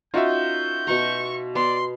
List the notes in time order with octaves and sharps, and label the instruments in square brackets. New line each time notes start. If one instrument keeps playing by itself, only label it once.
[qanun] C#4 D#4 A#4 [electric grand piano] F4 F#4 E5 [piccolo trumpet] G6
[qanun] B2 F#5 A#5 [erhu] C#6
[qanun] B3 [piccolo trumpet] D5 [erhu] C6